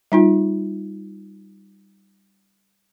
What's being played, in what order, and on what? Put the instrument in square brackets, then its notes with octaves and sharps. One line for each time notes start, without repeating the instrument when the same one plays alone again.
[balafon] G3 D#4 F4